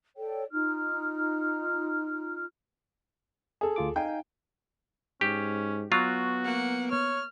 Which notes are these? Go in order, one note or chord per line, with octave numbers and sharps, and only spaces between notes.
A4 C#5 D5 G5
D#4 F4 F6
G#4 A4
D2 F4 D6
D#4 F5 G5 G#5
G#2 C#4 G4
F#3 B3 F4 F#4
A#3 F#5
C#5 F6